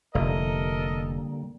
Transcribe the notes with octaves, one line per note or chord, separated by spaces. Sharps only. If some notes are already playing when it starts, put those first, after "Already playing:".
F1 D3 G3 A#3 A4 A#4 D#5